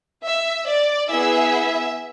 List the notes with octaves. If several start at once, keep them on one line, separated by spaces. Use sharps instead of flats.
E5
D5
B3 E4 G#4 E5